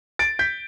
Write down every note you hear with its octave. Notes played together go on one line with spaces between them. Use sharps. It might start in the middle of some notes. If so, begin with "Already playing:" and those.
A6 D7
G6 B6